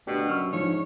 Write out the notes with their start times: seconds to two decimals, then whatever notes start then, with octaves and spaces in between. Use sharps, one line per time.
0.07 D2 B2 D4 G4
0.28 F#2 C#6 E6 F6
0.53 G#2 F3 D4 C#5